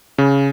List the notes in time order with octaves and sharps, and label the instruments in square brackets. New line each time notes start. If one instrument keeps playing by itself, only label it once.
[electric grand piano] C#3